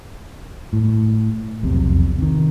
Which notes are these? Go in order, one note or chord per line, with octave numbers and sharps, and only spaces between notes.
A2
E1 B1 F2 C3
C3 D#3